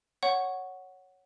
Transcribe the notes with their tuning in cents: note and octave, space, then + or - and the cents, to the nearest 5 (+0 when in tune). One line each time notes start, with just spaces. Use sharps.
C#5 +0 F#5 +0 C#6 +0